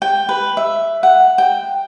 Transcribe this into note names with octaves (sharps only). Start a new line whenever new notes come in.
G5
B4
E5
F#5
G5